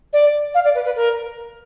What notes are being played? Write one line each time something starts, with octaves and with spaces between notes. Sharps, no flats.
D5
F5
D5
B4
B4
A#4